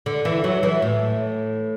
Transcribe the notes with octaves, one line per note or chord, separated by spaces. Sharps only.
D3
E3
F#3
E3
A2